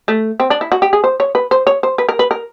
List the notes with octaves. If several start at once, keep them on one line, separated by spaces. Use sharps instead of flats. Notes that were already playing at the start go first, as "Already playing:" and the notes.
A3
C4
D4
E4
F#4
G4
G#4
C5
C#5
B4
C5
C#5
C5
B4
A#4
B4
A#4